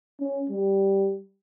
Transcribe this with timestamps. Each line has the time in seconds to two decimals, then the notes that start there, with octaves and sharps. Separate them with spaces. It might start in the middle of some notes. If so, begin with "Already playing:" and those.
0.20 C#4
0.50 G3